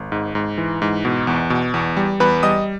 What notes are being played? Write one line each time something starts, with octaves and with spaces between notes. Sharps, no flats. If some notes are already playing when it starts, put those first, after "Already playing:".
Already playing: G#1
G#2
G#2
E3
G#2
B2
E2
B2
E2
G3
E2 B4 B5
G3 D#5 D#6